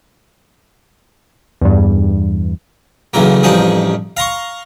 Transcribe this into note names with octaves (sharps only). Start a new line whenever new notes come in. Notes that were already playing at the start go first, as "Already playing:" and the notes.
E2 G2
B1 E2 C#3 F#3 A#3
A1 F2 F3 G3 D#4 G#4
F5 A#5 C6 C#6